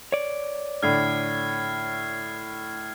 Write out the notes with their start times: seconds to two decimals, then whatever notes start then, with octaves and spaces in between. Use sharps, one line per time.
0.12 C#5 D5
0.83 A2 D3 F6 G#6 C7